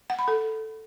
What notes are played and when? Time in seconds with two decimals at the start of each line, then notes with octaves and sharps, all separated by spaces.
0.10 F#5
0.19 B5
0.28 A4